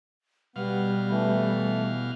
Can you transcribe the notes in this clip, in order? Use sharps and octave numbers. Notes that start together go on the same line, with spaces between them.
B2 G3 B3 F5
E3 A3